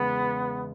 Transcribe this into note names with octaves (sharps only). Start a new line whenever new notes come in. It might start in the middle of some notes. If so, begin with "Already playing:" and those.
Already playing: E2 C#3 G#3 B3